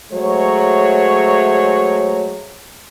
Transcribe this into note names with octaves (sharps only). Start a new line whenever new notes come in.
F#3 G#3 A3 C5 C#5